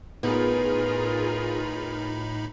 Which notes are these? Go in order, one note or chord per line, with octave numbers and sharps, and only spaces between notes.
A2 B3 D#4 F4 G#4 A#4 B5